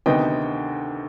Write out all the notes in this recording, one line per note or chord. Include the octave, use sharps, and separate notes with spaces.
D2 C3 D#3 B3 D#5 G5